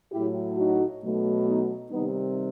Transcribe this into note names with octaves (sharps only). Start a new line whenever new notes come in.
A2 F#3 A3 E4 G4
D#4 F#4
B2 F#3 A3
B3 D#4
C3 D#3 G3 B3 D#4